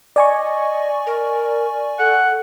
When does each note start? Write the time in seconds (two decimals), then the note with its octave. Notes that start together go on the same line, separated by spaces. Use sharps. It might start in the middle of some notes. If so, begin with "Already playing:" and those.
0.16 D5 D#5 G#5 C#6
1.07 A#4
1.99 A4 F#5